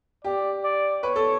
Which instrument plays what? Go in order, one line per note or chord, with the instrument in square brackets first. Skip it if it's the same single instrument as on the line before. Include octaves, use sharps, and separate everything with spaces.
[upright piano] G4 [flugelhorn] D5
[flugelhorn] D5
[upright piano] B4 [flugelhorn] C#5
[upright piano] A4